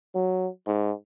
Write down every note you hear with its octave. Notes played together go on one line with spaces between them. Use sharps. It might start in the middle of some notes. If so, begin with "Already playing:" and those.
F#3
G#2